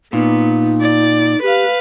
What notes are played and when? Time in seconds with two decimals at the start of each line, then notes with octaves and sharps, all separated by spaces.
0.13 A#2 B3 D#4
0.81 D5
1.43 G4 B4 F5